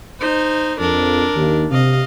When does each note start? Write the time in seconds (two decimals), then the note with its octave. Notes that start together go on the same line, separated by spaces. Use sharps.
0.21 D#4 C5
0.80 F2 D4 A#4
1.36 D#2
1.71 C3 D#5 F5